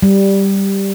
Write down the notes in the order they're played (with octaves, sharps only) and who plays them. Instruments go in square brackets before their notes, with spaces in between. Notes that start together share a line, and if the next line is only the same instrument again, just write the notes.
[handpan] G3